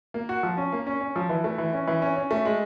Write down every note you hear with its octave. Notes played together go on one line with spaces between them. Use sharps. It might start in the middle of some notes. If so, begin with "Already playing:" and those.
A#3
F#4
F3
C#4
A#3
C#4
C#4
F3
E3
A3
E3
C#4
E3
C#4
C#4
A3
G#3